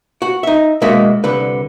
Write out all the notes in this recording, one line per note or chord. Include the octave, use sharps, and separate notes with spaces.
F#4
D#4 E5
B2 G#3 A#3 D4 F#4 E5
C2 D3 B4